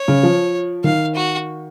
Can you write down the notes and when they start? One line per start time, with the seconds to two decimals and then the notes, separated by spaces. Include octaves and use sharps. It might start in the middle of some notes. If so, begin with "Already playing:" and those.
Already playing: C#5
0.08 C#3
0.23 F3
0.84 D#3 F5
1.15 F#4